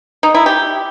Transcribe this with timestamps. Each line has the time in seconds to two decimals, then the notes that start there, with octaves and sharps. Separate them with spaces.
0.23 D#4
0.35 E4
0.46 G4